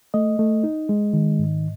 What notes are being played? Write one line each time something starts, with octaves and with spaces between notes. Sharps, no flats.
A3 D#5
A3
D#4
G#3
D#3
G#2